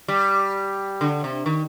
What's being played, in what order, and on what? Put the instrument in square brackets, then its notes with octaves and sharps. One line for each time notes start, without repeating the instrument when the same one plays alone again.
[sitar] G3
D3
C3
D#3